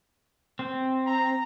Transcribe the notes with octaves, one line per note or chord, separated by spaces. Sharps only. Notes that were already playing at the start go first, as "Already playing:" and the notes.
C4
A#5